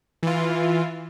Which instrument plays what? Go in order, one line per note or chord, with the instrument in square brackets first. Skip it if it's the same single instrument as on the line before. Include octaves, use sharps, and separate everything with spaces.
[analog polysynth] E3 F4